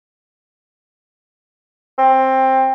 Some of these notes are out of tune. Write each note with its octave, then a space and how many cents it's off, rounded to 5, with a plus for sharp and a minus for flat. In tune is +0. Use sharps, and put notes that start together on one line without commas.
C4 +15